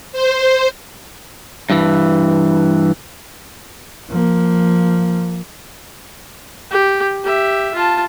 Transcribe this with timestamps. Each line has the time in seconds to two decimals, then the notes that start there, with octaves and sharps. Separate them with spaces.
0.13 C5
1.70 G2 E3
4.10 F3 A#3
6.71 G4
7.24 G4 E5
7.74 F4 A5